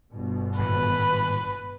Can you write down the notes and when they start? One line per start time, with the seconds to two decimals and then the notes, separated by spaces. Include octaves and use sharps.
0.12 G1 B2
0.59 G#1 A2 B4